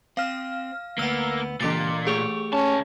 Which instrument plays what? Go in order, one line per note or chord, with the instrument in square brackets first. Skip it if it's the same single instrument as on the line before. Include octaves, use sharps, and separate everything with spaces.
[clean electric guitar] C4 [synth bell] F5 F6
[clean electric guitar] D2 B3 [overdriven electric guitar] A#3 [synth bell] E6
[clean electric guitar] C#2 G4 [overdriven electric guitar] A#2 [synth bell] E3 D6 A6
[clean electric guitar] A3 G4 C#5 [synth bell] G#4
[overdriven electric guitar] C#2 A5 [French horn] C#4